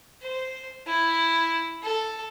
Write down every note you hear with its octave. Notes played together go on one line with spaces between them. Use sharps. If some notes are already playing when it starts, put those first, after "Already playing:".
C5
E4
A4